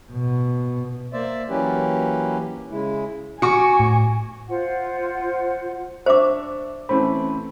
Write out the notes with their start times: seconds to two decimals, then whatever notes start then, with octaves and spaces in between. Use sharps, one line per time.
0.12 B2
1.13 A#3 C5 D5 E5
1.49 E3 F#3 A#3 C#4 G4 B4
2.71 C#3 G#3 E4
3.42 F#4 G#5 C#6 D6 C#7
3.79 A2
4.49 F4 C5 F#5
6.06 D4 C5 E5 C#6 D6
6.89 E3 A3 C4 C#4 B5